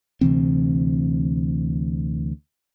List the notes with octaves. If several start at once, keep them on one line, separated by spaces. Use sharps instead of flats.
D2 C3 E3 C4